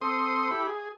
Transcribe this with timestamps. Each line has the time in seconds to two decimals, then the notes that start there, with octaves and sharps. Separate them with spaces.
0.01 C4 A4 C6 D#6
0.51 E4 G4 B5
0.67 G#4